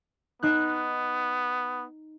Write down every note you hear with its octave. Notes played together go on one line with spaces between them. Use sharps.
B3 D#4 F#6